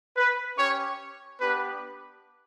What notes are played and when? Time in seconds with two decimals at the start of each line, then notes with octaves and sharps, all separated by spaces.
0.17 B4
0.57 C#4 G4 C#5
1.41 B3 D4 G4 B4